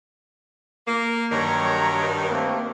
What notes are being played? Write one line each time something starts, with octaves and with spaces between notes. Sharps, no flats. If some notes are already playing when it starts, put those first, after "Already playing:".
A#3
G2 D#3 F#3 C#5 A#5
A3 A#3 C4